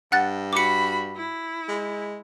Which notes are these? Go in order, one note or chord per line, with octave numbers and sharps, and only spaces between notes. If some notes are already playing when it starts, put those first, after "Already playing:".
G2 F#5 F#6 A6
F#4 B5 D6 C#7
E4
G#3